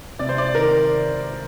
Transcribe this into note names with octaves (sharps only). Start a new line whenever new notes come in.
C3 D5
C5
D5
D#3 A#4